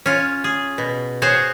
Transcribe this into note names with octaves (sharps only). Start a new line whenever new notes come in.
C#4 F4
G#4
B2
F#4 G#4 C5 C#5